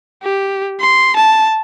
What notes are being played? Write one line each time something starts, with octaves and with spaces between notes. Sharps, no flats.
G4
C6
A5